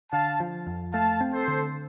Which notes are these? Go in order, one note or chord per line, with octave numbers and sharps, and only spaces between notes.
D3 F5 A5
F3
F2
A3 F5 A5
C4
A4 C5
D3